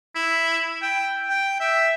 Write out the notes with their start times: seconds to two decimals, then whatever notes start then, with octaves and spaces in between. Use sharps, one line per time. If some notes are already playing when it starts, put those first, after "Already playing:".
0.15 E4
0.82 G5
1.30 G5
1.60 E5